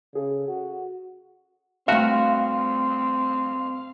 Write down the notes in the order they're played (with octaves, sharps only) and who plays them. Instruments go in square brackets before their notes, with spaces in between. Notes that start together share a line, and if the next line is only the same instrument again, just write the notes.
[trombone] C#3 [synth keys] G#4 A4
[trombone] F#4
[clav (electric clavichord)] G2 F#4 [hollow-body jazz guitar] A3 E5 [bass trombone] C4 [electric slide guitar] F5